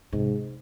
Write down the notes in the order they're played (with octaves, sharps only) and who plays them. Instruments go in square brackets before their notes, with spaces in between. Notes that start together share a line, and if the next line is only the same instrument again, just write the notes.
[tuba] G#2 [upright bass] C3